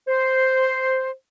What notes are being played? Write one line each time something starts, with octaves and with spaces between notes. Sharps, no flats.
C5